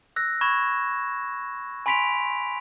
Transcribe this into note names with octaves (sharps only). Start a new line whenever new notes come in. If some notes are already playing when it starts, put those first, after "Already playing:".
E6 F#6 A#6
B5 C#6 G#6 E7
G#5 B5 C6 B6 D7 F7